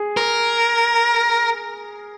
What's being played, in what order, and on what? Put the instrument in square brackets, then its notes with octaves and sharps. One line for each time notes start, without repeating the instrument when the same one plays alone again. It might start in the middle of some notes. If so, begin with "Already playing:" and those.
Already playing: [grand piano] G#4
[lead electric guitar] A#4